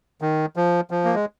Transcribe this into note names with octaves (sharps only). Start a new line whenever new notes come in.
D#3
F3
F3
A#3
G#3